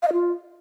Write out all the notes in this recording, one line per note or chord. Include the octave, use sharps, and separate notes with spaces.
F5
D#5
F4